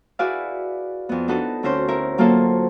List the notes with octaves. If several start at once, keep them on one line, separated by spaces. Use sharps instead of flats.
E4 F#4 G#4 B4 D5 F5
F2 B3
D4 D#4 F#4 A4 B4
D2 C4 C#4 C5 G6
E4 A#4
F#3 A#3 F4 A4 C5